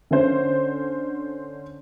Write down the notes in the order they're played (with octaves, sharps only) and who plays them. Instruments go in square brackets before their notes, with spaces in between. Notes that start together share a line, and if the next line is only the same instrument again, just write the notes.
[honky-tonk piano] D3 C#4 C5